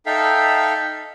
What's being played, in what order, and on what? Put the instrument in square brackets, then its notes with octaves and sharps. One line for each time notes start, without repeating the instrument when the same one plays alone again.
[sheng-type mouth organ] D#4 A4 E5 F5 G5